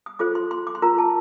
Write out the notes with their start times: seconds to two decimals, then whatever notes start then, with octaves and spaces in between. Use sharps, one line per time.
0.06 D#6
0.19 F4 A4 C5 D6
0.35 C6
0.51 C6
0.67 D6
0.75 C6
0.82 F4 A#4 A#5
0.98 A5